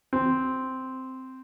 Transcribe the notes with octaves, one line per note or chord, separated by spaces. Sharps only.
C4